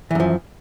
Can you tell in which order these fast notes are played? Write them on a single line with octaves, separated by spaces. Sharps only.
E3 F#2 F3